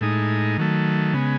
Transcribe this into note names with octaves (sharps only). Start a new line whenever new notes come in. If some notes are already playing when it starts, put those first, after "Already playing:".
A2 G#3 D#4
D#3 F#3 A3
C#3 G#3 B3